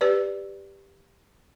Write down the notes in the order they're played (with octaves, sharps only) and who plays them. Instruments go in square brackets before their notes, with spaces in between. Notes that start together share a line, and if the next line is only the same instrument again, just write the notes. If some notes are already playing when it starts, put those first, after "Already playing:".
[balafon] G4 B4 D5